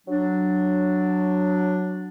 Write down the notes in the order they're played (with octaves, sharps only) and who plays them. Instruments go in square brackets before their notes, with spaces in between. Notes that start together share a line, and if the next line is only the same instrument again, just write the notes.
[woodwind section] F#3 D4